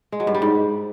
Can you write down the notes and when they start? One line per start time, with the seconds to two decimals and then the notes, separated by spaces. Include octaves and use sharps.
0.12 G#3
0.20 F#3
0.27 G2
0.34 G3
0.42 G#2